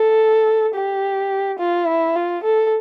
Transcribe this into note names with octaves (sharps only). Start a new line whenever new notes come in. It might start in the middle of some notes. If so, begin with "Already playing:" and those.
Already playing: A4
G4
F4
E4
F4
A4